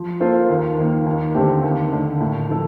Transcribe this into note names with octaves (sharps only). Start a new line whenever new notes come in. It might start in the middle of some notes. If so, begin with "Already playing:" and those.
Already playing: F3
A#3 F4 A4 C5
D#2
D#3 A#3
D#2
D3 A3 C4 G4
D#2
D3 A3
A2
F3 A3 D#4 A4